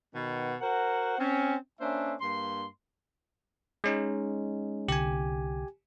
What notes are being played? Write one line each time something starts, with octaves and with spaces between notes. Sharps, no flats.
B2 D#3 B3
F#4 A#4 C5 F#5
C4 C#4
A#3 C#4 D4 C5 E5
G2 A#3 C6
G#3 C#4 D#4
C2 D3 G4 G#5